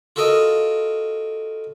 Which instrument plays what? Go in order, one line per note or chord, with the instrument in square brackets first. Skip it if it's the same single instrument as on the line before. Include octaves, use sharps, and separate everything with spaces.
[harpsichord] F4 F#4 A4 A#4 D#5